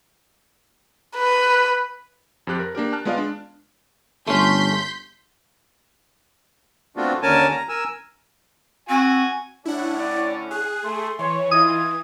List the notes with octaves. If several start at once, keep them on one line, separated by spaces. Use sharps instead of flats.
B4
F2 F3 G4 F#6
A#4
A#3 D4 G4 A#4
A5 F6 F#6
G#3 B3 F4 D5 D#5 F5
D4
G1 A3 C#4 C6 G6 B6
A3 B3 C4 D4 F4 F#4
D#2 D3 C#4 A#4 G#5 A5
A#5
A#4 G#5 E6
C4 F#4 G#5
A2 D3 C#4 D4 E4 F#5
D5
G#4 F#6
A3 C6
E3 C#5
E4 F4 D#5 D#6 G#6